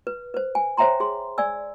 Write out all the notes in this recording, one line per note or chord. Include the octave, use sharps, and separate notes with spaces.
B4
B4 C5
G#5
C5 C#5 E5 G5 A#5 C6
G#4 C6
D5 G#5 E6